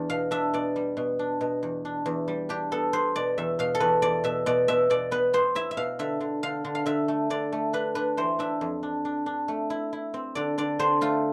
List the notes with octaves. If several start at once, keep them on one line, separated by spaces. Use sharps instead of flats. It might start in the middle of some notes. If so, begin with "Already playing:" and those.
Already playing: E2 D4 D5
B2 F5
D4 E5
B2 D5
G3
B2
D4
B2
E2
D4
E2
G3
D4 G4
B3 A4
B3 C5
B2 D5
E2 E5
B2 F5
A4
E2 B4
E2 D5
B2 E5
B2 D5
B2 E5
B2 D5
B3 B4
B3 C5
E4 E5
E5
B2 F5
D3 E5
D3
D3 F5
D3
F5
D3 E5
A3
D3 D5
A3
D4 B4
D4 B4
E3 C5
D4 E5
F2
D4
D4
D4
A3
E4
E4
C4
D3 D5
D3 D5
D3 C5
A3 F4